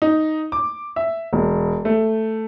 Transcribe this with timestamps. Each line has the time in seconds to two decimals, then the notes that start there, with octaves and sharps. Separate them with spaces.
0.02 D#4
0.52 D6
0.96 E5
1.33 E1
1.85 A3